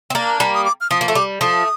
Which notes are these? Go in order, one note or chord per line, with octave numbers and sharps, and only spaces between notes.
C4
A#3 D4
G3 A#3 A5
D#6
D6
F6
F3 D#6
A#3
A3
G3 D6
F3 A3 D#6